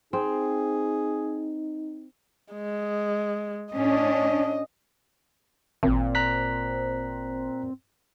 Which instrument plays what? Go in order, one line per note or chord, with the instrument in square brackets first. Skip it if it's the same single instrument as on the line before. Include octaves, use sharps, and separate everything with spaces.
[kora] C4 [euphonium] D#4 [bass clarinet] G#4
[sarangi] G#3
[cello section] A2 C#4 D4 [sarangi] D#5
[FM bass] G#1 [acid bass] A#2 [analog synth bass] C4
[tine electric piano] A#5 F#6 B6